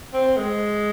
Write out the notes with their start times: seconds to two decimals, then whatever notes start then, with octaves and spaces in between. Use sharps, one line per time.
0.13 C4
0.37 G#3